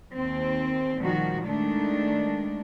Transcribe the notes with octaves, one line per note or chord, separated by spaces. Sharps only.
D#2 C4
A#2 D#3 F3 G3 F#4
D#3 G#3 A3 D4